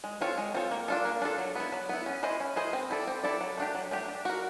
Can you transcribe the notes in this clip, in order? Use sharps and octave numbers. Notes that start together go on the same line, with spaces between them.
G#3
C4 F4 A4 C#5
G#3
C4 F4 A4 C#5
A#3
D4 F4 A4
A#3
D4 F4 A4
F#3
B3 E4
F#3
B3 E4
C#4
E4 G#4 C5 D#5
C#4
E4 G#4 C5 D#5
C4
E4 A4 D5
C4
E4 A4 D5
F#3
A3 D4 G4
F#3
A3 D4 G4
D4
F#4 A#4